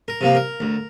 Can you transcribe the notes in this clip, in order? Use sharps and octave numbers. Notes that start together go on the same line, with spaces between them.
A#4
C3 F3 A#3
A#4
D2